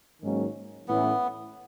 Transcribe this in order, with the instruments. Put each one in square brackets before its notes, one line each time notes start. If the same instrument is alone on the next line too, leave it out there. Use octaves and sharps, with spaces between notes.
[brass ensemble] G#2 D#3 F#3 A#3 C#4
[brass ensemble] A2 E3 A3 C#4 E4 [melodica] B3